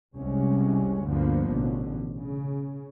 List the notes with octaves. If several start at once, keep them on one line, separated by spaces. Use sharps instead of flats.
F1 C2 C3 G#3 C#4
D2 G2 D3 F3 A#3 B3
A1 B2 D3
C#3